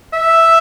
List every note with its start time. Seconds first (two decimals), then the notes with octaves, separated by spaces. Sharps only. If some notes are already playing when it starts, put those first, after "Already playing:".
0.13 E5